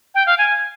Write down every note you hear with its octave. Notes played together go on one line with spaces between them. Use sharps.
G5
F5
G#5